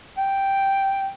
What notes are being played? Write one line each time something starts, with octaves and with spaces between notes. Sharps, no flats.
G5